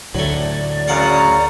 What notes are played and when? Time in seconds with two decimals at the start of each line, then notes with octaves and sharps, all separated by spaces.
0.14 D2 A2 F#3 A3 D5
0.88 F#2 C#3 F5 F#5 A#5 D6